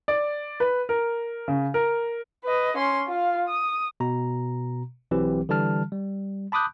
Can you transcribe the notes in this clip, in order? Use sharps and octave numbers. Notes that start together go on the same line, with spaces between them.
D5
B4
A#4
C#3
A#4
B4 D#5
C#4 C6
F4 F5
D#6
B2 A#5
B1 E3 F#3 C4 G4
D3 E3 G3 A5 F6
G3
A5 B5 D6 D#6 F#6 G6